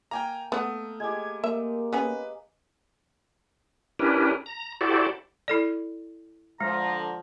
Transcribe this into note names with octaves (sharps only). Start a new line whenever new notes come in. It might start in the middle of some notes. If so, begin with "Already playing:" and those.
A#3 G5 G#5 A#5
A3 B3 F#5 D#6
G#3 G4 G#6
A#3 E5
B3 C#4 G#4 B4
C#4 D4 E4 G4 A#4 B4
A#5
E4 F#4 G4 A4 C5 D5
E4 A4 D5
D3 F3 G#3 A#5